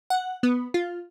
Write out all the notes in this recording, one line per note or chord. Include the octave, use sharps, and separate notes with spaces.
F#5
B3
F4